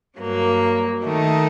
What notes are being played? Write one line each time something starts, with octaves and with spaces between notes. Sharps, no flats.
G2 F#3 A#3
D#3 A3 D#4